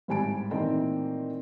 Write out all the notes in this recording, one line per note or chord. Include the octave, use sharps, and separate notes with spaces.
G#1 A2 G3 G#5 A5 D7
A#2 D#3 E3 A3 C4 D#4